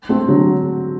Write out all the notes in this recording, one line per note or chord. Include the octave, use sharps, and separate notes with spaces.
A3 C4
D3 F#3